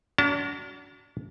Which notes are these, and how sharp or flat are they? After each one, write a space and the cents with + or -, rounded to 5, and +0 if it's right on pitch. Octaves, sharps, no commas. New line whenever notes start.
D4 -45 F#4 +0 A5 +25